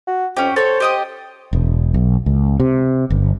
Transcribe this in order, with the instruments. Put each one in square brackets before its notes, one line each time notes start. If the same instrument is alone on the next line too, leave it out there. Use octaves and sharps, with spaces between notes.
[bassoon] F#4
[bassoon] F2 [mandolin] C#4 G4
[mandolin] A4 C#5 [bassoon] C5
[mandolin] G4 D#5 D#6
[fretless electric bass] E1
B1
C#2
C3
G1